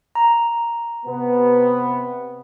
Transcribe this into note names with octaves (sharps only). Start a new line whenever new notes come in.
A#5
C3 B3